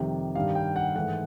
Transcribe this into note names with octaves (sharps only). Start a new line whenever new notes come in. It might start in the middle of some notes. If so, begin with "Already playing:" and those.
Already playing: F2 C3 D#3 G3
G2 D#3 G3 F5
G5
F#5
G#2 E3 A3 F#5